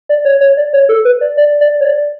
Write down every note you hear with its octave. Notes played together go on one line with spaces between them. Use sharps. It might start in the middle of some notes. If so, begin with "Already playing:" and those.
D5
C#5
C#5
D5
C#5
A4
B4
D5
D5
D5
C#5
D5